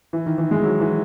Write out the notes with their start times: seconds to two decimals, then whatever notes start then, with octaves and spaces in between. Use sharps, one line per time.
0.13 E3
0.26 D#3
0.38 E3
0.51 G#3
0.63 F#3
0.80 E3